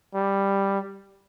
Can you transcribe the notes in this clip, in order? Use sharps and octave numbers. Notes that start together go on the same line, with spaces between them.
G3